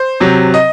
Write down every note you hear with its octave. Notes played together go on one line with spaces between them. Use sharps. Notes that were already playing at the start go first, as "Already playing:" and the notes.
Already playing: C5
C3 F#3
D#5